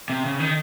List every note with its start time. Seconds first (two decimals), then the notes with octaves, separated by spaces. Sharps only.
0.10 C3
0.25 C#3
0.40 D#3